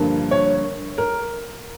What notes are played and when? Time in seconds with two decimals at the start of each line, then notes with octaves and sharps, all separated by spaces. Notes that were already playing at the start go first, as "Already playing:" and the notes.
Already playing: G2 D3 F3 A#3
0.31 C#5
0.98 A#4